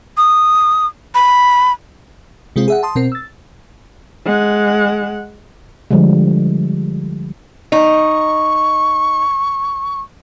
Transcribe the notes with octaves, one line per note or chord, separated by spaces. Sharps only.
D#6
B5
C3 G#3 C4 F4
G#4 E5 F#5
A5 C6 D#6
B2 C4 A#4 C7
E6 A6
G#3 F#5
D3 F3 G3 G#3
D#4 C#6